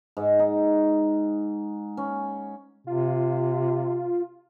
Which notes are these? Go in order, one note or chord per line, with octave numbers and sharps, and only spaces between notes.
G#2
D#4
C#4
C3 F4